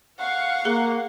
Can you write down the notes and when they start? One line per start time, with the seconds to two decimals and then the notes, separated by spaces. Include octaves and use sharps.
0.19 F5 F#5 C#6
0.65 A#3 G#4